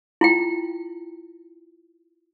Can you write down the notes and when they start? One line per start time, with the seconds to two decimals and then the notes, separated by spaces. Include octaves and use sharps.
0.21 E4 F4 G5